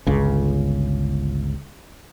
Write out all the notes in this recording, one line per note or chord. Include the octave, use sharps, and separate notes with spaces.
G1 C#2 C#3